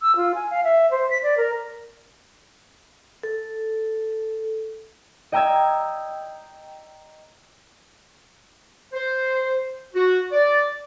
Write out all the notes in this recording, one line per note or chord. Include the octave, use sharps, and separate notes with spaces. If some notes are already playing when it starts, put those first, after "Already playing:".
E6
F4
G#5
F5
E5
C5
B6
D5
A#4
A4
D#5 G5 A#5 E6 G#6
C5
F#4
D5